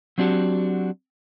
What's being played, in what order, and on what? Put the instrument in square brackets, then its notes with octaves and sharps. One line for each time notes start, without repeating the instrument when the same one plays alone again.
[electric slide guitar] F#3 C4 D4 F#4 G4